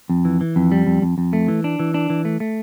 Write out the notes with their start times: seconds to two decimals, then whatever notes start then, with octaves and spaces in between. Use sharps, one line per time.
0.10 F2
0.25 E3
0.41 E3
0.56 F2
0.72 G3
0.87 F2
1.02 F2
1.18 F2
1.33 A3
1.48 E3
1.64 D4
1.80 E3
1.94 D4
2.10 E3
2.25 A3
2.40 A3